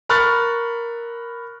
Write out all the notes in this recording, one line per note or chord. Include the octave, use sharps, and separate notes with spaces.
A#4 B5 C#6 F6 F#6 A6